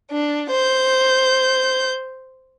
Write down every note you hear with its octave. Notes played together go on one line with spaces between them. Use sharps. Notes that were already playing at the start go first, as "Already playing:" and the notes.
D4
C5 G6